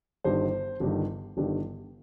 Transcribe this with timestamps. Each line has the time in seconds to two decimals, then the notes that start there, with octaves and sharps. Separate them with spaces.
0.24 G1 G2 D#3 C5
0.80 G1 G2 D#3
1.37 G1 G2 D#3